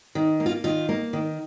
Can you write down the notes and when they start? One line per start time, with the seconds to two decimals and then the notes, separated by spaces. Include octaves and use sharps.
0.15 D#3
0.40 A#3
0.46 F4
0.64 D#3 F4
0.89 A#3
1.13 D#3